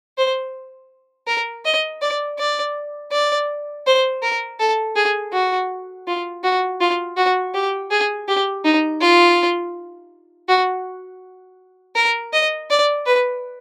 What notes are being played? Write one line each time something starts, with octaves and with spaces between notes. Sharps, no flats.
C5
A#4
D#5
D5
D5
D5
C5
A#4
A4
G#4
F#4
F4
F#4
F4
F#4
G4
G#4
G4
D#4
F4
F#4
A#4
D#5
D5
B4